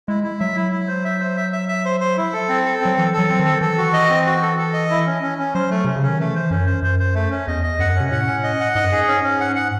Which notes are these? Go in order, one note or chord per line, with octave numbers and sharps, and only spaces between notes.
G#3 E4
E4
F#3 E5
E4
E4
C5
E5
C5
E5
E5
E5
C5
C5
E4
A4
C4
A4
F#3 C4
E3 A4
F#3 A4
C4
D#3
A4
E3 A4
F#4
D#5
C4
F#4
A4
A4
D#5
E4
C#4
C#4
C#4
F#3 C5
A3
C3 C#4
C#3
C#4
D#3
E3 A3
C5
F#2 C#4
C5
F#2 C5
C5
A3
C#4
E2 D#5
D#5
F#2 F#5
C3 C#4
A2 F#5
C#4
D#5
F#5
G#2 D#5
F#2
G#2 G#4
C#4
C#4
F#5
F#5